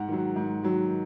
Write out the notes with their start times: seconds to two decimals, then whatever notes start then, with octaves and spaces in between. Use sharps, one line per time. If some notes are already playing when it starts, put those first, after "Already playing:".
Already playing: G#2 F#5
0.08 D#3 F#3
0.36 G#2
0.63 D#3 F#3